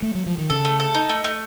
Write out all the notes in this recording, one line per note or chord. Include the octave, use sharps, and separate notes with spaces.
A3
F#3
F3
D#3
C#3 A4
A3
A4
D#4
A3
A3